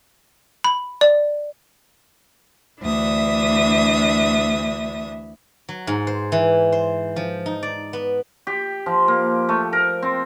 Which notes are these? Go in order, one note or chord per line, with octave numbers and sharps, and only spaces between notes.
B5
D5
D2 E3 D4 E5 D#6
F#3
G#2
C5
E3
C5
F3
D#4
D5
B3
G4
F3
A#3
A3
A#4
C4